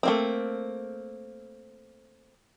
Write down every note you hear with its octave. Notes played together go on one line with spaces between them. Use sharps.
A3 A#3 C4